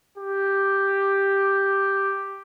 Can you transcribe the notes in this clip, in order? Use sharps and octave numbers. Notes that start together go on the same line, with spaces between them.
G4